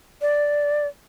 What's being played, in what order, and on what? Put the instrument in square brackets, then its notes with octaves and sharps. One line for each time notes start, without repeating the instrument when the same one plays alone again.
[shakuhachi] D5